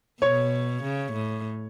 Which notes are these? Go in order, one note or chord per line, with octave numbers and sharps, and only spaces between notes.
B2 C#5
C#3
A2